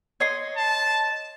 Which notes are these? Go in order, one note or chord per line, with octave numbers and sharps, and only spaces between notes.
C#5 D#5 C6
A5